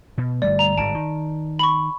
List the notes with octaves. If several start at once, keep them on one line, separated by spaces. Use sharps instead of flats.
B2
G1 G3 A3 D5
A#5 F7
G1 G#2 A5 D7
D#3
B5 C#6